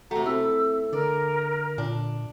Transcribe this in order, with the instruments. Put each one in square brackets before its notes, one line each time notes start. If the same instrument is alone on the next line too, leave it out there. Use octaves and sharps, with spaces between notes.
[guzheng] C3 A3 [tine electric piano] F#4 G5 [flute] A#5
[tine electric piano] C4 E4 E5 [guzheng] B5 [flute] E6
[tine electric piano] D3 [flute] A#4 [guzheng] D5
[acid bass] A#2 [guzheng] D4